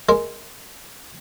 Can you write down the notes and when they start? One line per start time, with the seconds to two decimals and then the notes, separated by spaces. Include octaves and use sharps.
0.09 G#3 A#4